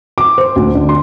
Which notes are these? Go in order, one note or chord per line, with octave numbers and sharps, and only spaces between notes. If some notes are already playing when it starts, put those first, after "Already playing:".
D6
C5
D2
D3
C6